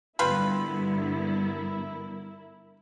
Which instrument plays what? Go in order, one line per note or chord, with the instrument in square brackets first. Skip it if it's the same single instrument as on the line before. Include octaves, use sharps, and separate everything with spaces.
[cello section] G2 D3 B3 [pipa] G3 F4 B4 [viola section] E4 A#4